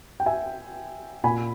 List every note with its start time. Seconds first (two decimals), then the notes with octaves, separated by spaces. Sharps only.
0.20 G5
0.26 E5 G#5
1.24 A#2 G#5 B5